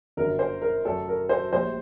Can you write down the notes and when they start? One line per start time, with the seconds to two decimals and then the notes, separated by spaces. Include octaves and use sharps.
0.17 G1 F#2 D3 A#4
0.39 C5
0.62 A#4
0.85 F#2 F#3 A3 A4
1.08 A#4
1.29 C5
1.53 A#1 A2 G3 C5